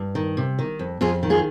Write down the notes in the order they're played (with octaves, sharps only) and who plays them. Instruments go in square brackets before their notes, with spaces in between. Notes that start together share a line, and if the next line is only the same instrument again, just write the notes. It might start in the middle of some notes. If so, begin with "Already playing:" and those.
Already playing: [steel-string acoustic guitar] G2
D#3
C3
D#3
F2
F2 F4 G#4
D#3
F4 G#4